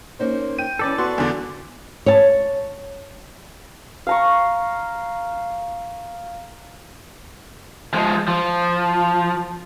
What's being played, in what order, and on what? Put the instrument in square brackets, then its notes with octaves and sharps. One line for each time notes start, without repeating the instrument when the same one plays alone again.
[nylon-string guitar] A#3 C#4 D#4 [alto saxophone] C5
[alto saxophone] G5 [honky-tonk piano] D#7
[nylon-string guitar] E3 C#4 [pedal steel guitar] A4 D5 A5
[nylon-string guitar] B3 [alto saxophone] F#4 [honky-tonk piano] C6
[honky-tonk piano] E2 D3
[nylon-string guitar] C#5 A5
[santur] F5 A#5 C#6
[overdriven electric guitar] F3 G#3
F3